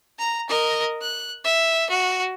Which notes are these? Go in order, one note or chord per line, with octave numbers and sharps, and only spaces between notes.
A#5
A#4 D#5
F#6
E5
F#4